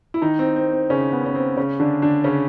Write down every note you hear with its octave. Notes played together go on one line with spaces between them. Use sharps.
E4
D#3 D#4
C4
C4
C4
C#3 C#4
B3
C#4
C4
C#3 C#4
D3 D4
D3 D4
C#3 C#4